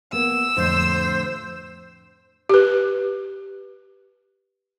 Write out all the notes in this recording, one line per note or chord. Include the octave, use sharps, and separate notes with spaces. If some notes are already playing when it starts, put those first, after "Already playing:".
A#3 B3 E6
F2 A2 D3 C5
G4 B4